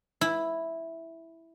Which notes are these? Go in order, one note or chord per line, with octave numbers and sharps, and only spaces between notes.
E4